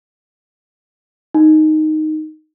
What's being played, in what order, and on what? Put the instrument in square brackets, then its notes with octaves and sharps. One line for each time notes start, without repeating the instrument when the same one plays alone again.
[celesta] D#4